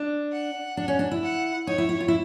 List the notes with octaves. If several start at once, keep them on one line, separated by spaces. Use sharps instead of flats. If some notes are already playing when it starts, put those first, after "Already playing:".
Already playing: D4
F#5
D4
C#4
D4
E4
F#5
D#4 C#5
E4
E4
F4
E4